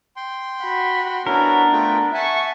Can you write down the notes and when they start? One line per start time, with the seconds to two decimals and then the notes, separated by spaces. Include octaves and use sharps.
0.16 G5 C6
0.62 F#4 B5
1.27 B3 C#4 D4 E4 F#4 A#4
1.72 A3 F4 G5
2.14 E5 F#5 G#5 A5 C#6